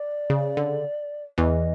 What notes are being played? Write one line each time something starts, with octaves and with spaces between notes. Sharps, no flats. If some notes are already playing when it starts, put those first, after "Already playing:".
Already playing: D5
C#3
D3
E2 E3 D#5